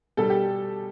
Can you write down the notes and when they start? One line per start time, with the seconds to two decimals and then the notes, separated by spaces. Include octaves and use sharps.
0.17 B2 G3 A4
0.30 G4